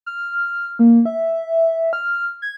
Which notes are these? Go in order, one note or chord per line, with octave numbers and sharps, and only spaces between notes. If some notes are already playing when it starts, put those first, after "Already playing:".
F6
A#3
E5
F6
G#6